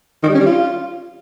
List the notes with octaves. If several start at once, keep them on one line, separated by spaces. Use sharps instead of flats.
D#3
G3
C#4
G3
F4